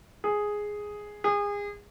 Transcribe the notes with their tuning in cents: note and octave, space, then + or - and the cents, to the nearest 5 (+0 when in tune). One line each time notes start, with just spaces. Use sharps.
G#4 +0
G#4 -30